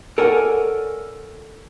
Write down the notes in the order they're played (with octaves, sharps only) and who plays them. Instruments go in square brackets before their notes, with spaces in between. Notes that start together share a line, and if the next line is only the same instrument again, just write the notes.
[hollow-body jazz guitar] A4 A#4 C#5 D5 F#5 G#5